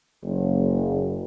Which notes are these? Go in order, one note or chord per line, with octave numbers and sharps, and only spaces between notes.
F#1